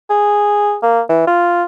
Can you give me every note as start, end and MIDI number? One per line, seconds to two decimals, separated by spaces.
0.10 0.77 68
0.83 1.01 58
1.09 1.24 52
1.27 1.64 65